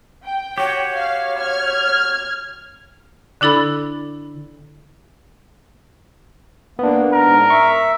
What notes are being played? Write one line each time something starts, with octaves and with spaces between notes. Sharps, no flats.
G5
F#4 G4 C#5
F5
F6 G#6
D3 D4 E4 A4 B5
A#3 B3 D4
G#2 A#4
E5 C#6